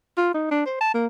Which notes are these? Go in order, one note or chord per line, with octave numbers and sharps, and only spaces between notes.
F4
D#4
D4
C5
A5
A#3